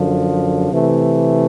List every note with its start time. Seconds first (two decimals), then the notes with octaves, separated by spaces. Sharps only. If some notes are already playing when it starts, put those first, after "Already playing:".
Already playing: F#2 D3 F3
0.70 C3 E3 A3